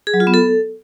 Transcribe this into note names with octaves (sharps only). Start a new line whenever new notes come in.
G#4
F#3
F4
B3
A4